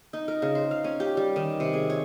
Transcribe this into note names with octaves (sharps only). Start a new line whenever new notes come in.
D#4
A#4
C#3
C5
F5
C#4
G4
G3
D#3
C3
G#4
C#5